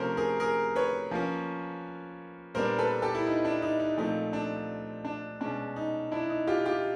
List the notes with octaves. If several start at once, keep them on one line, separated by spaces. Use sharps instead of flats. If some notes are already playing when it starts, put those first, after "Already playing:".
Already playing: C3 F3 A3 C#4 A#4 C5 C#5
G#4 A#4
G#4 A#4
B4 C#5
F3 A#3 C#4
A#2 G3 B3 D4 A#4 C5
A4 B4
G4 A4
E4
D#4
D4
D#4
D#4
A#2 F3 A3 C4 D#4
D4
D4
B2 G#3 C#4 D4
D#4
D4 E4
D#4
F4 G4
F4 G4